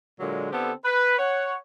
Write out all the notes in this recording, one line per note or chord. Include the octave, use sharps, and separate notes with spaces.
A#2 D3 F#3 G#3
D3 B3 C4 E4 G4 A4
B4
C#5 F#5